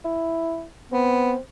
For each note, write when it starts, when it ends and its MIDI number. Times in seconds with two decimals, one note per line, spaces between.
0.05 0.65 64
0.92 1.34 59
0.92 1.39 60